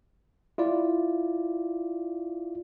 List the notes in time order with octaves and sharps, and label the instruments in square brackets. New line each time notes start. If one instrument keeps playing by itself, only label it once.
[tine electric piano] E4 F4 D5